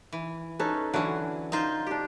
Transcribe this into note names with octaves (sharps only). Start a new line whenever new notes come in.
E3
C#4 D#4 A4 B4
D3 E3 F#3 C#4 F#5
D#4 F4 C5
D4 G4